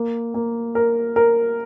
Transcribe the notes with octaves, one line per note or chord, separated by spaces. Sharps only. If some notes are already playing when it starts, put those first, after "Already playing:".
Already playing: A#3
A#3
A#4
A#4